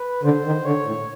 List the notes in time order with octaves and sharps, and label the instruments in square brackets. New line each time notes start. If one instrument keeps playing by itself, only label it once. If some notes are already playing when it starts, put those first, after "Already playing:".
Already playing: [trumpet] B4
[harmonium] D3 [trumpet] C5
[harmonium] D#3
[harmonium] D3 [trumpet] C#5
[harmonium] A2